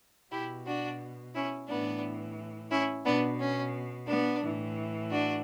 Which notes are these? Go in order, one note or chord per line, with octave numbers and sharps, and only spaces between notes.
B2 E4 G4
D4 F#4
C#4 E4
A2 E3 B3 D4
C#4 E4
B2 B3 D4
C#4
B3 D4
A2 E3
D4 F#4